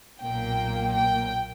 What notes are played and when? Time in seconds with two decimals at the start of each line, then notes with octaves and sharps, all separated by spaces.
0.21 B1 A#2 A#3 G5
0.93 G5